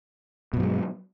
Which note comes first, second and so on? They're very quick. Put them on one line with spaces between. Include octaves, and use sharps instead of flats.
B2 G2 F#3 G#3